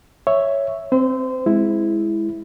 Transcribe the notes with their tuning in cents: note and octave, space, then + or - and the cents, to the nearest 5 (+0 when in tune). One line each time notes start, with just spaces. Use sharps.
C#5 +0 E5 +0
C4 +0 C5 -30
G#3 +0 E4 +0